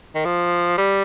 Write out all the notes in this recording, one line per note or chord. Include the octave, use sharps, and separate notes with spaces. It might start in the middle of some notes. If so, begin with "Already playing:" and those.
D#3
F3
G3